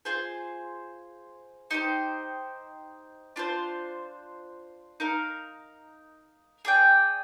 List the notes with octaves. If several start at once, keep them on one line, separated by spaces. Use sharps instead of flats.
F4 G#4 C5
D#4 G4 C5
D4 F4 C5
D#4 A#4 F5
G#4 D5 G5